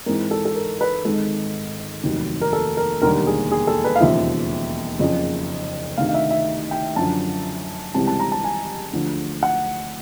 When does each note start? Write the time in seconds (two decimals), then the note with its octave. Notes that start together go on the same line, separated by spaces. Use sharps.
0.06 G#2 E3 G#3 C4 A#4
0.31 A4
0.45 A4
0.55 A#4
0.81 B4
1.05 G#1 G#2 D#3 G#3 A4
2.03 F1 D#2 D#3 F#3
2.41 A#4
2.53 A4
2.77 A#4
3.02 E1 D#2 D3 G3 A#3 A#4
3.27 G#4
3.51 G#4
3.67 A4
3.84 B4
3.96 F5
4.00 E1 D#2 C#3 F3 E5
4.99 F#1 F2 C#3 F3
5.97 D2 C3 D#3 F5
6.09 F5
6.14 E5
6.30 E5
6.71 G5
6.96 F#2 D3 F3 A5
7.94 C#2 C3 E3 G3 C4 A5
8.07 A5
8.19 A#5
8.32 A5
8.44 G#5
8.93 D2 D3 F3
9.43 F#5